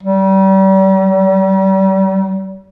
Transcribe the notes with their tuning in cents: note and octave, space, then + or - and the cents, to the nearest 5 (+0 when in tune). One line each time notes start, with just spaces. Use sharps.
G3 -35